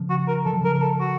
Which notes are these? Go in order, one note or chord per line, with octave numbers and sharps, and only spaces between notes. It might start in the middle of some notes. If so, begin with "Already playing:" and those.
Already playing: C#3 F3
F#4
A#4
F3 A4
F#3
C#3 F3 A#4
A#4
A4
F#4